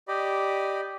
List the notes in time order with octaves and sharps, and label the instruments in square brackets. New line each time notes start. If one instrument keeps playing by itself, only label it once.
[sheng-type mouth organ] G4 D5 D#5 B5